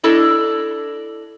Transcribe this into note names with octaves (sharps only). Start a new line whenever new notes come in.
D4 E4 A4 D#5